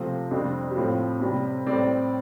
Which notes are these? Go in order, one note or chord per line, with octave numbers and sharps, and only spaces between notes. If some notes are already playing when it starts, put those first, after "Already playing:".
Already playing: C3 F3 A3 C4 C5
F2 C3 G3 C4 D4
G4
A2 F3 C4 F4
C3 G3 C4
A2 G3 C4 D5